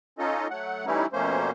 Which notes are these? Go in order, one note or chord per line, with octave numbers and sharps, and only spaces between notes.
C#4 D#4 F4 A4 D#5
F#3 A3 F#5
E3 G3 A3 C#4 D#4 E4
F2 B2 A3 A#3 C#4 C5